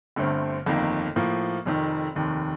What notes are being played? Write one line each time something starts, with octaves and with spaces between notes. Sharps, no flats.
G1 G2 D3 A3 C4
G1 F2 D#3 A#3
A2 F3 A#3
F1 F2 D#3
F1 D#2 D#3